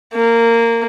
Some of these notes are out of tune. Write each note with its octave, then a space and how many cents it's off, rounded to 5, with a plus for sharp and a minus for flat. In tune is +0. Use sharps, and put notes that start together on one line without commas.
A#3 -15